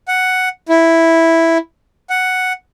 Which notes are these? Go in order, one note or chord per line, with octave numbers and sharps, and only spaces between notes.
F#5
E4
F#5